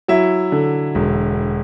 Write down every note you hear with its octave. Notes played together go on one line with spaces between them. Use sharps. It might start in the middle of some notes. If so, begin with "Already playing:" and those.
F#3 E4 E5
D3
E1